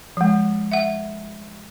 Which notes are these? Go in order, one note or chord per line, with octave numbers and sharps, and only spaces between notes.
F3 G#3
E5 F#5